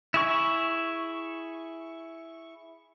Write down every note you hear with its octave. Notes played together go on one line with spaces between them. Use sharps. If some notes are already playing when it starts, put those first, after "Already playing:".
E4 G#4 C#6